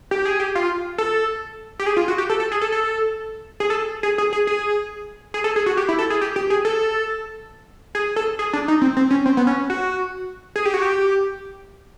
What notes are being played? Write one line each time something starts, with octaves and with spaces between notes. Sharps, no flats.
G4
G#4
G4
F4
A4
G4
G#4
F4
F#4
G4
A4
A4
G#4
A4
A4
G#4
A4
G#4
G#4
G#4
G#4
G#4
A4
G#4
F#4
G4
E4
A4
G#4
G4
G4
G#4
A4
G#4
A4
G#4
D4
D#4
C4
C4
C#4
C4
B3
C#4
F#4
G#4
G4
F#4
G4